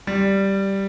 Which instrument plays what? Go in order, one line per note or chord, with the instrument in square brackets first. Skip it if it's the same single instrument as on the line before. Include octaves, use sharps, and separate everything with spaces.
[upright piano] G3